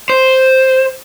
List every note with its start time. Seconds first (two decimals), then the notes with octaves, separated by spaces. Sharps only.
0.10 C5